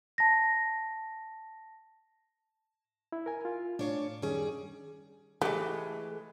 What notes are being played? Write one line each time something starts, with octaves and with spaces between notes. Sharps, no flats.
A5 A#6
E4
A#4 G#5
F4
A2 D4 C#5 F5
F#2 D#3 G3 C#4 G#4
E3 G#3 A3 G4